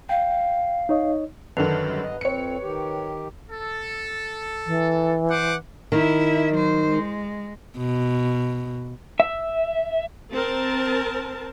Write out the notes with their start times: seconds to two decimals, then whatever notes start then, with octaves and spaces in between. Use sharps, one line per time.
0.09 F5 G5
0.89 D#4 C#5 D#5
1.57 F#2 D3 D#3 B4
1.85 G3
2.03 G2 B3 D#5
2.21 F2 C4 C#5 C#7
2.62 D#3 G4
3.50 A4
4.66 E3
5.30 C5 F#5 D6
5.92 D#3 E4 E5
6.54 F#3 C5
6.89 G#3
7.77 B2
9.20 E5
10.33 C4 A#4 A5